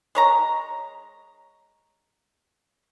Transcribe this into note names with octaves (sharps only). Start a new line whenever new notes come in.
G#3 C#5 A#5